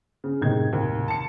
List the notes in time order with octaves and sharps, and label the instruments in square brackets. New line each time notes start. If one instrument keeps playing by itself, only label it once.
[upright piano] C#3
[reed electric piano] F#2 A2 C3 [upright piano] D#3 G#3 G#6
[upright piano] D#2
A5 C#7